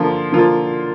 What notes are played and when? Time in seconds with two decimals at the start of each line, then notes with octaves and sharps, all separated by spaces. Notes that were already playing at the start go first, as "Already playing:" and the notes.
Already playing: D3 F3 A#3 F4
0.32 D3 F3 A#3 F4